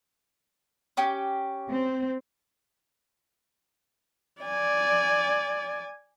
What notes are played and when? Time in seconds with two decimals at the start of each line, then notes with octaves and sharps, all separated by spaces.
0.97 C#4 G4
1.71 C4
4.42 D5 G#5